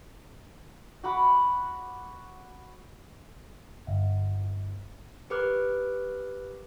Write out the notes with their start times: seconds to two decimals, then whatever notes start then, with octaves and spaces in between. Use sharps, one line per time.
1.04 F#4 F#5 B5 D6
3.87 G1
5.30 G4 A#4 B4 D6 F#6